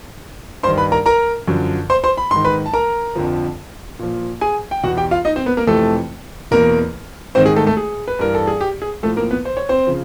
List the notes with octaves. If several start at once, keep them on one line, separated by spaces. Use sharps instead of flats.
G2 D#3 C5 C6
B4 B5
A#4 A#5
A#4 A#5
F#2 D3 F3
C5 C6
C5 C6
B5
G#2 D#3 C6
B4 B5
A5
A#4 A#5
F2 D3 F3
A#2 F3
G#4 G#5
G5
E2 B2 F#4 F#5
G4 G5
F4 F5
D#4 D#5
C4 C5
B3 B4
A#3 A#4
F2 C3 E3 A3 A4
E2 B2 A#3 A#4
G#2 D#3 C4 C5
G#4
A3 A4
A3 A4
G#4
B4
G2 E3 A#4
A4
G#4
G4
G#4
A2 F3 A3 A4
A#3 A#4
B3 B4
C5
C#5
C4 C5
C#3 F3